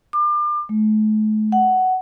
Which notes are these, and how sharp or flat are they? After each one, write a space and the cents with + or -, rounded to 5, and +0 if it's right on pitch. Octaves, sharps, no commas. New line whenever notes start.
D6 +35
A3 -40
F#5 +10